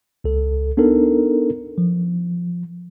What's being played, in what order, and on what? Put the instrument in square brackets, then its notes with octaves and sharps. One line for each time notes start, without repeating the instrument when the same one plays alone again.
[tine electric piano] C#2 A4
B3 D4 D#4 A4 A#4
F3